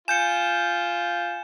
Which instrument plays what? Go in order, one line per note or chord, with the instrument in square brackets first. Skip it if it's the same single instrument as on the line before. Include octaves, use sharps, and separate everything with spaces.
[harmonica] F4 [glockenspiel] G#5 C#7 [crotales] G6 E7